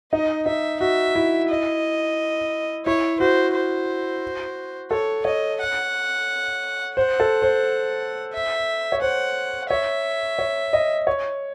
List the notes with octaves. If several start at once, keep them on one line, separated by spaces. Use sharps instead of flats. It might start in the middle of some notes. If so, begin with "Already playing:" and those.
D#4 D#5
D#4 E5
F#4 E5
E4
D#5
E4 C#5
F#4 C5
C5
A4 C#5
C#5 D#5
F#5
C5 F#5
A4
C5
E5
C#5
C5 F#5
C#5 E5
C#5
D#5
C#5